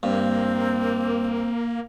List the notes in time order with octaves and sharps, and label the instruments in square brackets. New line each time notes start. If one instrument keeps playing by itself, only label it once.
[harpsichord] G2 [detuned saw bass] A#3 [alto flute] C4